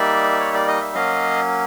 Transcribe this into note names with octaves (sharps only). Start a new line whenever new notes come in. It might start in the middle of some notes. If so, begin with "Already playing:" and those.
Already playing: G3 A#3 D#4 D5 E5
C#5
D5
D#5
E5
F#3 A#3 C#4 D#5 F5